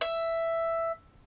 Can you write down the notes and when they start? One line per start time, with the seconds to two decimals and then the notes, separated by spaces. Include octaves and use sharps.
0.01 E5